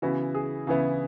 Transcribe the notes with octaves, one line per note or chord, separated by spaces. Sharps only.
C#3 E3 B3 E4 F#4
G#4
C#3 E3 B3 E4